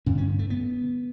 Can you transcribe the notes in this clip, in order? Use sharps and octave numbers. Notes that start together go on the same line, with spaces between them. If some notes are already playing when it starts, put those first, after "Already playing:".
G2 D3 C#4
C#4
A3
B3